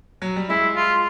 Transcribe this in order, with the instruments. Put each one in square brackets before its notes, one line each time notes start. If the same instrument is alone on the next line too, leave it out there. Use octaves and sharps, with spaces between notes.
[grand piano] F#3
G3
[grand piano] G#3 [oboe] E4
[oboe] F4